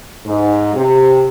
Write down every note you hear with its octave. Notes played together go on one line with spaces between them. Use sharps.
G#2
C3